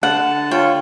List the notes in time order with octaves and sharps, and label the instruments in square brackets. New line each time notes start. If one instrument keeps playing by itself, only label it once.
[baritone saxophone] D3 [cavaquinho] F#5 [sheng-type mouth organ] A5
[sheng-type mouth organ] F4 C#5 [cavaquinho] G5